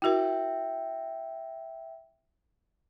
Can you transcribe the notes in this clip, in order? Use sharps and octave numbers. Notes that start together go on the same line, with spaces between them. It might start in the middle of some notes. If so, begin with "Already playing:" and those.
E4 F#4 A#4 E5 G5